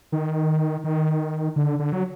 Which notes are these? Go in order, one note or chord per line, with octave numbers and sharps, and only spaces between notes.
D#3
D#3
D3
D3
F#3